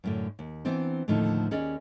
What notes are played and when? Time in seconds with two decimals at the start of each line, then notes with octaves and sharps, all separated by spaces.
0.04 F#2 A2 D3
0.39 D#2
0.65 E3 B3 C4 D4 C5
1.08 D#2 A2 D3 F3 A3 D#4
1.51 D#2 C#4 G#4 D5 D#5